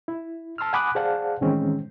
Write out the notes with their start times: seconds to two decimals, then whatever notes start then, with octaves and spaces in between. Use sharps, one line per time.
0.08 E4
0.58 A5 C6 E6 F6
0.73 F#5 G#5 B5 D6 D#6 F#6
0.95 G#4 C5 D5 F5 F#5 A5
1.41 A2 D#3 E3 G#3 C4 C#4